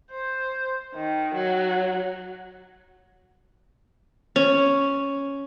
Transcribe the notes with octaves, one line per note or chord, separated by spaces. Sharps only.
C5
D#3
F#3
C#4